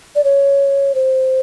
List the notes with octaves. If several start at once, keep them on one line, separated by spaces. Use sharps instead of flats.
D5
C#5
C5